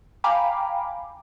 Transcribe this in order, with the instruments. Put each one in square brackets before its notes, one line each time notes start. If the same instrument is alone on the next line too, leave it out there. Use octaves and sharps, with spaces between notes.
[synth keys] F5 G5 G#5 A#5 B5 D6